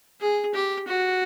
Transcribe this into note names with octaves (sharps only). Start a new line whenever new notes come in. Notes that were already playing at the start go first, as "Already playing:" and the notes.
G#4
G4
F#4